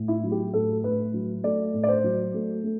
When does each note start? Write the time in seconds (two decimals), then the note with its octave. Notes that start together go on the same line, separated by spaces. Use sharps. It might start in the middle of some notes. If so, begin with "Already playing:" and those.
Already playing: A2
0.08 E4
0.24 F#3
0.31 G4
0.54 A2 A4
0.84 A2 B4
1.14 F#3
1.44 A3 D5
1.74 A2
1.83 D5
1.88 C5
2.04 F#3
2.34 A3
2.64 A3